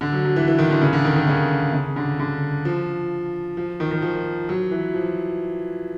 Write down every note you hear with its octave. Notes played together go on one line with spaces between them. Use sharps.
D3
F#3
F#3
E3
E3
D#3
D3
C#3
D3
D#3
D#3
C#3
C#3
D3
D3
F3
F3
D#3
D#3
F3
F#3
E3
F3